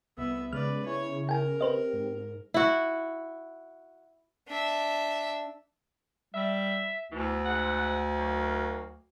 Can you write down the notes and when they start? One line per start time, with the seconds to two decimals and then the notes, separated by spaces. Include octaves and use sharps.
0.18 C2 B3 E5
0.53 C#3 G#3 B4 D5 F6
0.86 E4 G#4 C#5
1.29 A#4 G5 G#5
1.61 C4 G4 B4 C5 D#5
1.93 G#2
2.54 E4 F#4
4.48 D4 E5
6.34 G3 E5
7.12 D2 B2 E3
7.46 G#2 F#5
8.16 D#3 F#3 A#3